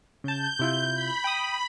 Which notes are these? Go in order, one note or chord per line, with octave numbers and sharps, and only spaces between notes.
C#3 A5 G6
C3 E4 F4
B5
G5 D#6